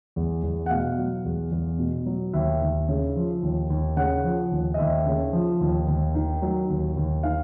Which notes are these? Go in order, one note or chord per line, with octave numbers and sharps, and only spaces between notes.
E2
E2
F#5
B2 F5
F#3
E2
E2
B2
F#3
D#2 E5
D#2
C#3
F3
D#2
D#2
C#3 F#5
F3
D#2
D#5
D#2 E5
C#3
F3
D#2
D#2
D#3
F#3
D#2
D#2
D#3 F5